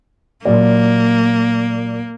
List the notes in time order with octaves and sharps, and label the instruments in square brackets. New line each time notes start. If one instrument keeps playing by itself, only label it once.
[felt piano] A#2 F#3 D5 [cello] A#3